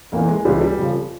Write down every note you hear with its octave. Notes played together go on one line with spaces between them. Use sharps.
F1 E2 E3 A#3
G#3
C#2 C3 E3 G3
G3
F1 F2 C#3 F3